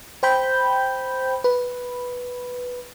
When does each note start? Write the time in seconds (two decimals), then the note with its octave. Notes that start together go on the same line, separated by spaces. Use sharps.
0.23 C5 G5 B5 G6
1.44 B4